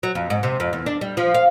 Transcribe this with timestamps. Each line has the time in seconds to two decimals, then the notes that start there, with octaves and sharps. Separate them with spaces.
0.03 F#3
0.15 F2
0.30 G#2
0.43 C3
0.60 F2
0.73 E2
0.86 D4
1.01 G3
1.17 F3
1.34 F5